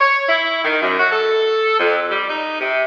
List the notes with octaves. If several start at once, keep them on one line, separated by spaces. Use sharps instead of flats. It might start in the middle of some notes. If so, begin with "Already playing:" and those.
C#5
E4
D#3
F#2
F#4
A4
F2
G3
D#4
C3